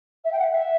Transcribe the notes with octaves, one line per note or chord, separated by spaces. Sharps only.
E5
G5
F#5
E5